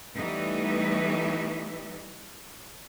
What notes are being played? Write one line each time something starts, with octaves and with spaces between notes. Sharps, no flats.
E3 G3 A3 B3 D#4 E5